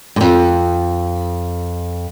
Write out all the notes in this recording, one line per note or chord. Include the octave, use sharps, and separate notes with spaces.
F2 G#2